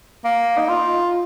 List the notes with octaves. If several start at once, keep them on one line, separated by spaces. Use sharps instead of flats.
A#3
D#4
F4